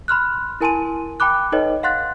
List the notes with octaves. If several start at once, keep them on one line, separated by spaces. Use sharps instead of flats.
B5 C6 F6 F#6
E4 A#4 G#5 A5 C6 D#7
G5 A5 B5 D6 F#6
D#4 A4 B4 C#5 D#5 G5
F5 F#5 C6 F#6 A6